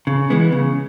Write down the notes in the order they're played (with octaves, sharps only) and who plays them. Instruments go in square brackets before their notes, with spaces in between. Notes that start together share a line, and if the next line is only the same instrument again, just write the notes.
[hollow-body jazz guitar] C#3
E3 G#3 B3
C#3